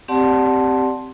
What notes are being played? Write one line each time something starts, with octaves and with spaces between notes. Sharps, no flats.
C4 G4 D5 F#5 A5 C6